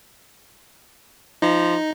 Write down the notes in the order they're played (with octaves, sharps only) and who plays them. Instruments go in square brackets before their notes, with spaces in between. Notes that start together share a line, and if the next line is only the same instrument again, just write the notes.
[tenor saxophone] F3 [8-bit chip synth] D#4